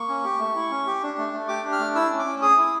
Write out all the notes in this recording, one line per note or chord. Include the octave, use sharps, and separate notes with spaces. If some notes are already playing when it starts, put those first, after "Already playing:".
Already playing: A#3 C#6
C#4
G4
A3
E4
C#4
G4
D4
A3
A3
G4 D6
D4
F6
A3
E4 E6
C#4
D6
C#4
G#4 D#6
E4